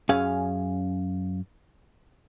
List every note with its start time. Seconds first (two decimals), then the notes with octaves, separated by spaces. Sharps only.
0.09 F#2 C#4 G#4 F5